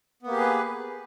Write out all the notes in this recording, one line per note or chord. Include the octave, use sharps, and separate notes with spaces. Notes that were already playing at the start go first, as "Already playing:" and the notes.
A#3 B3 G4 G#4 B4